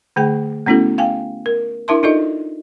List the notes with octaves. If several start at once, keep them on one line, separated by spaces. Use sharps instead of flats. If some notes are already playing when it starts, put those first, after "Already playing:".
D3 A3 G#4 G5
A3 B3 C#4 E4 F#4 A4
F5 G5 G#5
A#4
D4 E4 A#4 E5 A5 C6
D4 D#4 F4 A4 D5 D#5